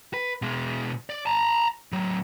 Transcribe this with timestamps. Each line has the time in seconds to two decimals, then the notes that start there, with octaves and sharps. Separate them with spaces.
0.14 B4
0.42 B2 G#3
1.10 D5
1.26 A5 A#5
1.93 A2 F#3